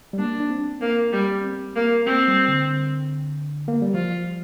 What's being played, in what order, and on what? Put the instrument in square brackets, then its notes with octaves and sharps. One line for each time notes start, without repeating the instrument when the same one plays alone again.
[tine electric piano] G3
[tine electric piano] A#3 [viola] D4
[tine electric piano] D4
C4
[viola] A#3 [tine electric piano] C4
[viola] G3
[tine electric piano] C4
[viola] A#3
[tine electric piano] A#3 [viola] C4
[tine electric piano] G3
D3
A#3
G3
[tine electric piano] F3 [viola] F4